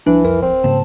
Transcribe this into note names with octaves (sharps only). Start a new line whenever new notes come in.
C2 E3 F3 D4
F2 A#4
D1 C4
G#2 C#3 A#3 A5